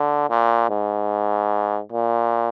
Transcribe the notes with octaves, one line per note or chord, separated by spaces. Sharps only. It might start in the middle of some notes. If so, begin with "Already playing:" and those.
Already playing: D3
A#2
G#2
A#2